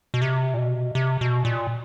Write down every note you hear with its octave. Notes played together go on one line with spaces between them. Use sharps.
B2
C3
A#2
B2
C3
B2
A#2